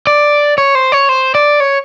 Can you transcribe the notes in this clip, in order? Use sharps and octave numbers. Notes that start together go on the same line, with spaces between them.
D5
C#5
C5
C#5
C5
D5
C#5